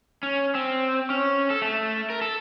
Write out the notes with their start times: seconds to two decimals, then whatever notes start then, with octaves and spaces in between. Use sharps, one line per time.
0.23 C#4
0.55 C4
1.10 C#4
1.50 A4
1.62 A3
2.10 A#4
2.21 A4